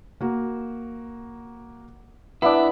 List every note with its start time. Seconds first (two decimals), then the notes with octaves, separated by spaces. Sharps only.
0.21 A#3 F#4
2.42 B3 D4 E4 B5 D6